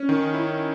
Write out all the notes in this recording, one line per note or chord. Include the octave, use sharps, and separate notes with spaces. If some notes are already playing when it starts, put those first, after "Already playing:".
Already playing: C#4
D#3
E4